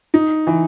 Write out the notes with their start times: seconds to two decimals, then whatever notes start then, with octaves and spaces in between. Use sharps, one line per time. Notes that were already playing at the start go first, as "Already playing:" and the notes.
0.14 D#4
0.47 E3